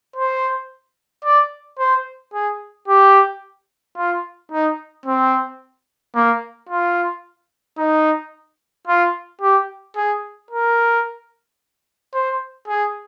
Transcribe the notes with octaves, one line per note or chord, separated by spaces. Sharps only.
C5
D5
C5
G#4
G4
F4
D#4
C4
A#3
F4
D#4
F4
G4
G#4
A#4
C5
G#4